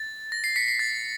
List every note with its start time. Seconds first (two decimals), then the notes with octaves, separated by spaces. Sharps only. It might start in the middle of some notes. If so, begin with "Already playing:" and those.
Already playing: A6
0.32 A#6
0.44 C7
0.56 B6 C#7
0.68 C7
0.79 A6